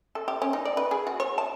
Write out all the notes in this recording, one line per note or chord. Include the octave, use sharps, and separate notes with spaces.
A4
G4
C#4
D#4
D5
B4
G#4
F#4
C#5
A5